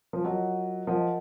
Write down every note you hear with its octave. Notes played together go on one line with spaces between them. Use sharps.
F3
F#3 F4 A#4 D#5 F#5
F3 F4 A#4 D#5 F#5